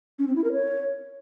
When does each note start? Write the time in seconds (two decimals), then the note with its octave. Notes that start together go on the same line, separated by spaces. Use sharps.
0.19 C#4
0.27 C4
0.36 E4
0.44 A#4
0.52 C#5